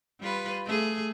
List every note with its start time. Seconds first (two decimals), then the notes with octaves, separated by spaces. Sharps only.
0.21 G3 F4 B4
0.66 A3 G#4